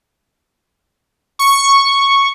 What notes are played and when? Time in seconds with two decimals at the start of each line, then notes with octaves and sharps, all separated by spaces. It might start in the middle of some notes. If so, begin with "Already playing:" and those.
1.39 C#6